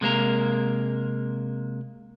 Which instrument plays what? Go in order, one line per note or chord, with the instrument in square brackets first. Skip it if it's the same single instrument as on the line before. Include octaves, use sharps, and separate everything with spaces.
[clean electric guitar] C3 G#3 A#3 A#4